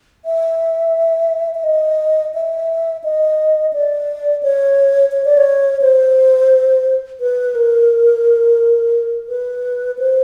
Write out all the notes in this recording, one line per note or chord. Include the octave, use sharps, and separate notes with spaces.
E5
E5
D#5
E5
D#5
D5
C#5
C#5
D5
C#5
C5
B4
A#4
B4
C5